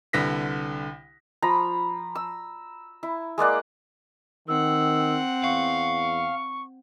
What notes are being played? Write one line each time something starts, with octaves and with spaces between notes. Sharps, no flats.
C2 D3 B4 A#6 B6
F3 A#5 B5
E6
E4
G#3 A#3 D5 F#5
D#3 C4 F#5 E6
E2 F5 C#6